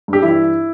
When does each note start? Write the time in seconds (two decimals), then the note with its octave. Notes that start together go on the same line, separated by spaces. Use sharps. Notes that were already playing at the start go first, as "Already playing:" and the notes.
0.08 G2 G4
0.23 E3 E4